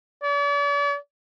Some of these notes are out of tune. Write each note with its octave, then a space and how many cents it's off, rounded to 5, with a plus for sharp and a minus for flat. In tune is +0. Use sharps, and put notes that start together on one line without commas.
D5 -45